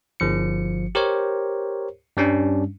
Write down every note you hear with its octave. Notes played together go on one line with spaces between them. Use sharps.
G1 F3 C#7
G4 A#4 C5 C#5
G2 G3 C#4 D4